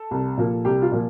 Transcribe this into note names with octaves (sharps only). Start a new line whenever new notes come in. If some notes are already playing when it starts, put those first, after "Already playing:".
Already playing: A4
C2
A#2 F3 A#3
C2 G4
F4
A#2 F3 A#3